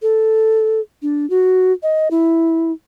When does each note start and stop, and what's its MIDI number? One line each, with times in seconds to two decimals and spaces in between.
0.02 0.80 69
1.02 1.28 62
1.30 1.72 66
1.83 2.08 75
2.11 2.72 64